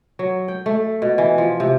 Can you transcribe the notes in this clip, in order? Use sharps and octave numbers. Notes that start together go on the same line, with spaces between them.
F#3
G5
A3
B2
E3
F3
C3